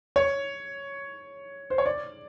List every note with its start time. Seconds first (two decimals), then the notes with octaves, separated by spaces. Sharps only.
0.16 C#5
1.70 C5
1.78 C#5
1.86 D5